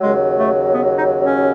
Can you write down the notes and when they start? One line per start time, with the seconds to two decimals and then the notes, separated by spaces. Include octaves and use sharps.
0.01 D#2 C#3 F#3 G#3
0.38 A3
0.74 B3
0.98 D#4
1.23 C#4